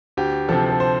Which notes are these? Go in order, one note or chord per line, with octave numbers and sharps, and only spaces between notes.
D2 G4
C3 F3 A4
A4
C5